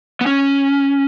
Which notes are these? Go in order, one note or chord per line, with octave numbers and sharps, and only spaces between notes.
B3
C#4